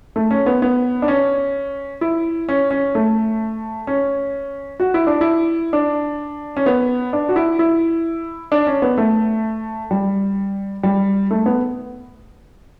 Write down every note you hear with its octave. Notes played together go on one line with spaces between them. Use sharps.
A3
C#4
B3
B3
D4
C#4
E4
C#4
C#4
A3
C#4
F#4
E4
D4
E4
D4
C#4
B3
D4
F#4
E4
E4
D4
C#4
B3
A3
G3
G3
A3
B3